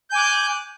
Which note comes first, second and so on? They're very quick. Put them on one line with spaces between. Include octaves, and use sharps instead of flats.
G6 G#5 D6 F#6